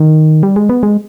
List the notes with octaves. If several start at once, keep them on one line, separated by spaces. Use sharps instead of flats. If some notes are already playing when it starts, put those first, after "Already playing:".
Already playing: D#3
G3
G#3
B3
G#3